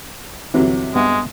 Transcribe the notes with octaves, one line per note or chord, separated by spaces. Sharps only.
G1 C3 E3 F#3
G2 G#3 B3 E5